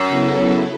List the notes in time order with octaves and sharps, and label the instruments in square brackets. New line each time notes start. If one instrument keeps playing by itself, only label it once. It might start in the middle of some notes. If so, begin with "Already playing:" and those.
Already playing: [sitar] F#2
[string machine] C#3 F#3 B3 E4 A4